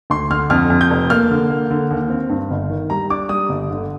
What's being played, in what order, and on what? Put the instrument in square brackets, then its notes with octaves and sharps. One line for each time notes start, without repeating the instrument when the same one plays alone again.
[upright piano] D2 C6
D3 F6
F2 F6
F2
G6
F1
A#3 F6
D3
A#3
D3
D#2
C4
G2
G1
D#3
G3 A#5
D4 D6
G3 D#6
G1
D3